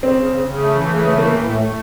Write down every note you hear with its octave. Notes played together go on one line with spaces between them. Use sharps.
C#3 C4
C#3
C#3
C#3
A3
E3
C#3
A3
E3 A#3
A2
A3
A3